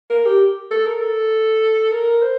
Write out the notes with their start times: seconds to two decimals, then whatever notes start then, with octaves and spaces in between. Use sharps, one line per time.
0.10 A#4
0.26 G4
0.71 A4
0.86 A#4
1.02 A4
1.92 A#4
2.22 C5